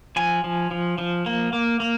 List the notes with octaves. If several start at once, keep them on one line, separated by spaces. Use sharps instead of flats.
F3 G#5
F3
F3
F3
A#3
A#3
A#3